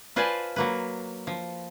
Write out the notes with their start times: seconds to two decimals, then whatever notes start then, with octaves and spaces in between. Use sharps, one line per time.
0.16 F4 B4 C5 D5 G#5 A5
0.56 F#3 A#3 B4
1.27 F3